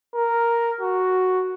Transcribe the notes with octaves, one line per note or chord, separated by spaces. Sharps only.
A#4
F#4